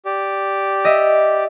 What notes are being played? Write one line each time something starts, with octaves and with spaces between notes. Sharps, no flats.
G4 D5
D#5 E5